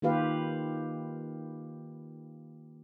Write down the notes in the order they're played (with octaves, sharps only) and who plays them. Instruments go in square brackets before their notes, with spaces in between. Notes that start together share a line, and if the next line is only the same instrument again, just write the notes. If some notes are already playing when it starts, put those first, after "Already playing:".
[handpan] D#3 A#3 F4 G4 B4 F5